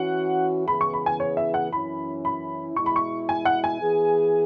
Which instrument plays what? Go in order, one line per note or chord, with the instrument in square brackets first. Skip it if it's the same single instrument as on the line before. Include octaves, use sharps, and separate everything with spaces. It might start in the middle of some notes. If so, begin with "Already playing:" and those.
Already playing: [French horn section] E3 C#4 F#4 [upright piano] F#5
[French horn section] C#3 E3 B3 E4 G#4 [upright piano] B5
[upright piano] C#6
B5
G#5
C#5
E5
F#5
[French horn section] F#2 E3 C#4 E4 [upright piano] B5
[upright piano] B5
[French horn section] B2 G#3 E4 [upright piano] C#6
[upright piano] B5
C#6
G#5
F#5
G#5
[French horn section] E3 B3 G#4